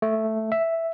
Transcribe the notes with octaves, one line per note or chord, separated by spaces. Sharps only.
A3
E5